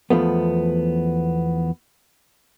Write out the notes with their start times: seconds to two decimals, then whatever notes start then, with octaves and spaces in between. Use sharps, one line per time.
0.10 E2 F3 A3 B3